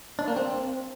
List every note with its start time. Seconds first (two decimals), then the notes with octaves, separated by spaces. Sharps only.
0.19 D4
0.28 A#3
0.36 C4